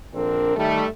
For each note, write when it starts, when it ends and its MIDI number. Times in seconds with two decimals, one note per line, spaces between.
0.15 0.54 34
0.15 0.54 50
0.15 0.54 60
0.15 0.54 62
0.15 0.54 70
0.56 0.85 51
0.56 0.85 55
0.56 0.85 57